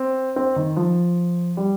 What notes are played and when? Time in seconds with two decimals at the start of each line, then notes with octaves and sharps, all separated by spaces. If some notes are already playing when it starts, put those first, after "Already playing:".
Already playing: C4
0.36 C4
0.56 D#3
0.77 F3
1.57 G3